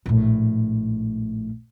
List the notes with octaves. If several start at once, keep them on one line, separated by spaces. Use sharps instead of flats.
A#1 A2